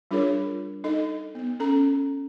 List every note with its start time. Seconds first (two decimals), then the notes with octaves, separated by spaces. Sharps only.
0.11 G3 D4 F4 G#4 A#4 C#5
0.84 D#4 A4 D#5
1.35 B3
1.60 C#4 A4 A#5